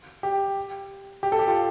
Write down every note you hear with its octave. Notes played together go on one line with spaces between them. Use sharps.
G4
G4
A4
G4
F4